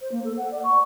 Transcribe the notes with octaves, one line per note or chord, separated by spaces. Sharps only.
C5
A#3
A4
F#5
D5
C#6